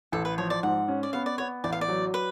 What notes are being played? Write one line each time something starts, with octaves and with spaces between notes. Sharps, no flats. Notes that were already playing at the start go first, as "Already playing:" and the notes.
A1 A4
B4
F3 C#5
D5
G#2 F#5
C#4
D5
B3 F5
D5
B3 C#5
A1 D5
F5
D5
F#3
B4